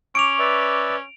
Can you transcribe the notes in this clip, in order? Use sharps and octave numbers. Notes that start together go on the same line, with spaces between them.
C#4 C#6 D6 D7 F7
B4 D5 E5